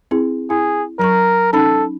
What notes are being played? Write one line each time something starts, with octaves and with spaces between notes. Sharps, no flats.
C4 E4 G#4
E4 G#4
F#3 A#4 A#5 C#6
C#4 D#4 A4 B5